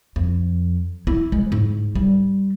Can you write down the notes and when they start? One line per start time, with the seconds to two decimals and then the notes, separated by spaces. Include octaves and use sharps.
0.16 F2
1.07 E4
1.32 G#3
1.52 G#2
1.95 G3